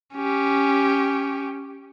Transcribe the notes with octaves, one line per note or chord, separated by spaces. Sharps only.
C#4 G4